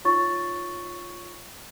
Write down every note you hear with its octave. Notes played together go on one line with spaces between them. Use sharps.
D#4 F4 C#5 C#6 A6